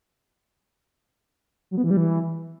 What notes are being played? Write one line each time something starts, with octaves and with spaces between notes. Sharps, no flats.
F#3
B3
E3
G3
E3